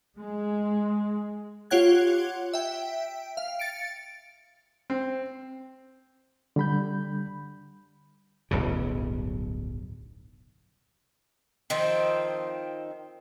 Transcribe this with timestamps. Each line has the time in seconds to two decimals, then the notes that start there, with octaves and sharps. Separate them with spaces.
0.20 G#3
1.70 F4 G4 C#5 F#5 F#6 G#6
2.53 E5 G5
3.37 F5
3.59 A6 C#7 D7
4.90 C4
6.56 D3 G3 B5 G6
8.51 D1 B1 G2 C#3
11.70 D#3 F3 C4 D#4